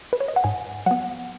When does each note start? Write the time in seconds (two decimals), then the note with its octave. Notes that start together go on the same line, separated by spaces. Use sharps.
0.13 B4
0.20 C#5
0.28 D#5
0.36 F#5
0.44 G#2 G#5
0.86 F#3 B3 F#5